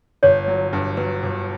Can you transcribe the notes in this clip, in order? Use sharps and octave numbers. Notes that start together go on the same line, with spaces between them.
G1 C#5
F#3
G2
F#3 B4
G1